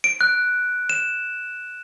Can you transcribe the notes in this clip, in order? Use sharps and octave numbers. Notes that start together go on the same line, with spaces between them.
D7
F#6
E7